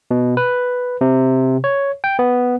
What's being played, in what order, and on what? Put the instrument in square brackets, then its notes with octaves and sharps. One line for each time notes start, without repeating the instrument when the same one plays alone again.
[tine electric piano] B2
B4
C3
C#5
G5
B3